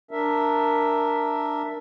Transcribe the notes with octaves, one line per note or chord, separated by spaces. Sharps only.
D4 A#4 E5